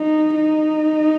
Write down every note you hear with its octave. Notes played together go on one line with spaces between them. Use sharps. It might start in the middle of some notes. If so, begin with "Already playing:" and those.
Already playing: D#4
D#4